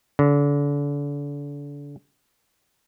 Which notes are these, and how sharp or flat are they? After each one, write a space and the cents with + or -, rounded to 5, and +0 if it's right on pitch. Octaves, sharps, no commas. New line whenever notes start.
D3 -35